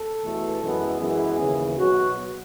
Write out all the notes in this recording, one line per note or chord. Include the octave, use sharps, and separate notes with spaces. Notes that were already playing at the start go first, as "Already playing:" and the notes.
Already playing: A4
E2 B2 A3
F#2 E3 G#3 B3
F#2 E3 G#3 B3 G#4
D#2 C#3 E3
B2 F#3 B3 F#4